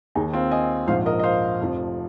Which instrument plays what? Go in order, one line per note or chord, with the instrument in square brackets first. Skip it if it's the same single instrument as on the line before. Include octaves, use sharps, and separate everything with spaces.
[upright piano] D#2 D#3 D#4 G#4
C4 F4
D#5 G#5
A#1 G#2 F3 C5 F5
A#4 D#5
D#5
C5 F5
F1 F2 F3